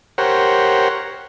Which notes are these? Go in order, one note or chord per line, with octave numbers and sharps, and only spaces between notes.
G4 A#4 C5 C#5 F#5